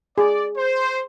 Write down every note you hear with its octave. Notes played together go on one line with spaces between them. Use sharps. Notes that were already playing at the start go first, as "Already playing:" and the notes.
G#4 D5
C5